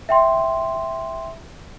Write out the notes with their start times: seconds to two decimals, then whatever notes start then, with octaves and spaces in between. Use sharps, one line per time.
0.09 E5 G5 C6